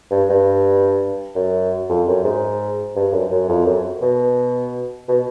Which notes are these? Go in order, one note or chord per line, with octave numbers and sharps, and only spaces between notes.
G2
G2
F#2
F2
F#2
G#2
G2
F#2
F#2
F2
F#2
B2
B2